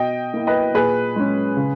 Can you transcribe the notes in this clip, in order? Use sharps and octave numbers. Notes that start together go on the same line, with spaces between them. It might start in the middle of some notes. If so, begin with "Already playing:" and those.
Already playing: B2 D#5 G5
A#3 E4
B4 D#5
A#2 G#4 B4
G#3 C#4
C#3